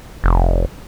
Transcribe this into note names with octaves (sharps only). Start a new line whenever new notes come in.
F1